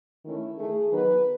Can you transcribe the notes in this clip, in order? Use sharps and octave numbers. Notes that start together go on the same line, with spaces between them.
D#3 A3 C#4 E4
D#3 A3 D#4 G#4
D#3 F#3 B3 D#4 B4